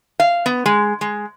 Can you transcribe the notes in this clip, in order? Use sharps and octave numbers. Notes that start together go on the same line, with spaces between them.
F5
B3
G#3
G#3